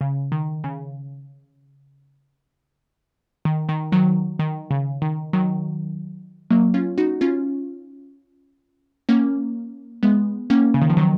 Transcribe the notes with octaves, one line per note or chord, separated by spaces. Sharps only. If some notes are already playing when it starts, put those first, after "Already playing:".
C#3
D#3
C#3
D#3
D#3
D#3 F#3
D#3
C#3
D#3
D#3 F#3
F#3 A#3
C#4 F4
D#4 F#4
C#4 F4
A#3 C#4
G#3 B3
A#3 C#4
C#3
D#3
F3
D#3 F#3